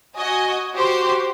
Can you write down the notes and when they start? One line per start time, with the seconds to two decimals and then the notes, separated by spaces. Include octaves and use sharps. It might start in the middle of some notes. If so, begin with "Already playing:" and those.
0.17 F#4 D#5 G#5
0.77 F#4 G4 C5 C6